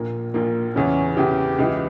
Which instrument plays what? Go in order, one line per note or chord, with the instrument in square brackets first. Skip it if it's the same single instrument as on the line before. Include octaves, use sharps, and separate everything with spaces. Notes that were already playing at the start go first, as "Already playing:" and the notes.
Already playing: [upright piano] A#1 A#2 A#3
A#1 A#2 A#3
[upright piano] E2 C#3 E3 [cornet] C#4
[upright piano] E2 C#3 E3 [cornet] G4
[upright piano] C#2 C#3 E3